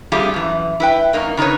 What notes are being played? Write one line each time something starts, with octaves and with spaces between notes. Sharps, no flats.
G3 A3 C4 F4 G4 G#4
F#2 E3
E4 B4 G5
F#2 A#3 D#4
C#3 D#4 A4 B4 C#5